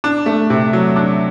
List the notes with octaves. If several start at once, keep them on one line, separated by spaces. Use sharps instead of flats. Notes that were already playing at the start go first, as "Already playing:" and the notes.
D4
A3
C3
F#3
D4